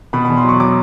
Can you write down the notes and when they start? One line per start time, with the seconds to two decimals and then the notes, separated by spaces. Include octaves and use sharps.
0.13 B2 B5
0.25 E2 B5
0.37 C6
0.44 F#3 C#6
0.60 F#3 D6